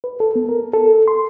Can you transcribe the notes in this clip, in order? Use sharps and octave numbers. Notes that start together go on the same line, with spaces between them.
B4
A4
B3
A#4
A4
C6